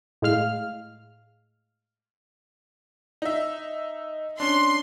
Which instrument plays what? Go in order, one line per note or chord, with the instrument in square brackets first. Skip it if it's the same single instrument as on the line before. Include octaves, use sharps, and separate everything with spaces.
[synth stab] A2 G#3 F5 F6
[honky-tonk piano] D#4 E5
[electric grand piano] C#4 D4 [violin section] C6